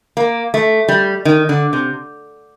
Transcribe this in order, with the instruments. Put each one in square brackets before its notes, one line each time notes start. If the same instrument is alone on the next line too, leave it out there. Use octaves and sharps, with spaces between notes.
[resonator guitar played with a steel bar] A#3
A3
G3
D#3
D3
C3